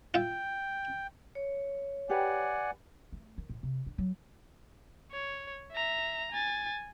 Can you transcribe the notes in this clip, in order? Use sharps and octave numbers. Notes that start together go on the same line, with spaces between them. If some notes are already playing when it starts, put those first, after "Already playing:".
F4 E5 G5
C#5
G4 B4 D5 F#5 G#5
A3
D#3
A2
C3
D4
F#3
C#5
E5 A#5
G#5 A6